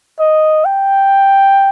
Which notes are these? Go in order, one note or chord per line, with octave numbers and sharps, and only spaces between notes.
D#5
G5